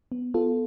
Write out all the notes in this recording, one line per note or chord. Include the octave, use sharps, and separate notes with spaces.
B3
B3 F4 A4